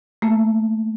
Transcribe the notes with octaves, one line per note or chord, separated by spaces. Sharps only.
A3 A#3